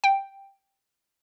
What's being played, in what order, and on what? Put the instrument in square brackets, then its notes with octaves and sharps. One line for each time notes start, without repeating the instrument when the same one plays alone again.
[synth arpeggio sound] G5